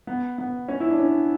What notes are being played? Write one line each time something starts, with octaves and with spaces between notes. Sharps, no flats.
B3
B3
C#4
E4
D4
C#4